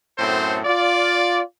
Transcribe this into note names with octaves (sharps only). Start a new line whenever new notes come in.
F#2 A2 C4 A4 C5
F4 D5